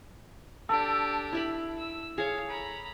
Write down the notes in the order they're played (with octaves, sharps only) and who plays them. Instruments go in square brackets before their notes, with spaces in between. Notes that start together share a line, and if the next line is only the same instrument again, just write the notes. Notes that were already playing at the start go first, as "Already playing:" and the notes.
[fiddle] D4 G4 [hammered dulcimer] A4
[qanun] E4 E5 B5
[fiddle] E6
[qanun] G#4 C#5 [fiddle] F5
[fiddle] A#5 B5